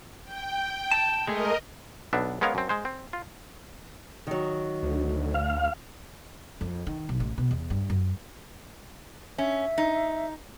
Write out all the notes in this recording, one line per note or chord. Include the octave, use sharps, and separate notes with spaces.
G5
A5
G#3 A3 G#4 A#4 D#5
B1 B3 D4 E5
G#3 B3 C#4 A#4 C#5 F5
F#2 C4
G#3 C5
C4
F4
D#3 F#3
D2
F5
F2
D#3
B1
A1
B2
E2
G2
F#2
C#4 E5
D#4